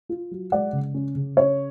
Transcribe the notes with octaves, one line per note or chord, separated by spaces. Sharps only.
F4
F#3
G#3 D5 F#5
C#3
C#4
C#3
C#4 C#5